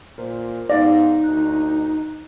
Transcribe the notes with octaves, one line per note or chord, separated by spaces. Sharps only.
A#2 A#4 C5
G#2 B3 D#4 D5 F5 A#6
D2 F#6